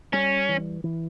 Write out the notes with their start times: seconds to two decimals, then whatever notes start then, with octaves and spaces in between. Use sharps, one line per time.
0.13 G3 C#4
0.49 E3
0.84 E3